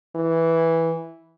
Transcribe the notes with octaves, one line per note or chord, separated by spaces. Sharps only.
E3